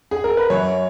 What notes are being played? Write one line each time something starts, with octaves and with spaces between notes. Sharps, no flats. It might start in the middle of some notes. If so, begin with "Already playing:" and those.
G#4
A#4
B4
F#2 C#5